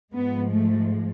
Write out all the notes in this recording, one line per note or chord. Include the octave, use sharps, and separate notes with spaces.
G#2 F3 G#3 B3
A3